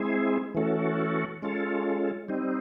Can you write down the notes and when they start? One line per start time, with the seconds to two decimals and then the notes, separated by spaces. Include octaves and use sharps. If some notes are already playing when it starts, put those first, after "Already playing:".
Already playing: G#3 C4 E4 G#4
0.55 E3 A3 C#4 F#4 A4
1.42 G#3 C#4 F4 A4
2.28 G3 C4 D#4